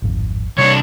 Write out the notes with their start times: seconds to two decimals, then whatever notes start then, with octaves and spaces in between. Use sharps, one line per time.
0.02 D1 G#1 F2
0.58 C2 G3 D4 C#5